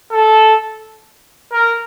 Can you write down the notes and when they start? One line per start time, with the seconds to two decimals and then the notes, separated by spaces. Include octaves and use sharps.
0.12 A4
1.53 A#4